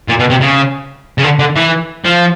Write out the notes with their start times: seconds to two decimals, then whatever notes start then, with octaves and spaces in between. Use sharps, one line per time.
0.09 A#2
0.19 B2
0.30 C3
0.41 C#3
1.18 C#3
1.23 D3
1.39 D3
1.56 E3
2.05 F3